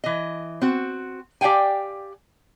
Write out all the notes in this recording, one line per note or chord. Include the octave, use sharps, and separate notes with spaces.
E3 D#5
C4 F#4
G4 D5 F5 G5 G#5